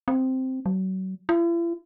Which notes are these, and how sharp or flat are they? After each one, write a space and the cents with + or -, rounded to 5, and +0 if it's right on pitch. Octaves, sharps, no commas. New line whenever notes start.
C4 -5
F#3 +30
E4 +45